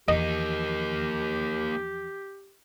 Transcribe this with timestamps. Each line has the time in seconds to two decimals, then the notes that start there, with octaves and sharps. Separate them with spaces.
0.08 E2 F3 A#3 D#4 G4 D#5